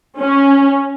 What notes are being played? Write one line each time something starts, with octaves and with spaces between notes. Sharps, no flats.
C#4